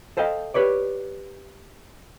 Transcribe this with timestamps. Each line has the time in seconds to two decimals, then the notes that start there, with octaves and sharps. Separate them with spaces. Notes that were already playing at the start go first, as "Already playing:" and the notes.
0.17 A4 C5 D#5 F5 G5
0.54 G4 B4 C#5 D5